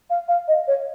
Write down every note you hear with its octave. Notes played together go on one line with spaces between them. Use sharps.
F5
F5
D#5
C#5